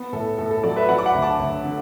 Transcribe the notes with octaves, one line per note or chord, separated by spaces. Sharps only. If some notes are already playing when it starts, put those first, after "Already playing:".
Already playing: B3
A2 A4
A2 A4
A4
F#3 A4 D5
B4 E5
F#3 D5 F#5
D6
F#5 B5
D2
A5 D6
D2
D3